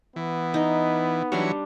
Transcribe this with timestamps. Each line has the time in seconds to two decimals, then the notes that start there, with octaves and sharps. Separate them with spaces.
0.16 E3 B3
0.54 D#4
1.32 E3 F#3 G3 D4 C#5 C6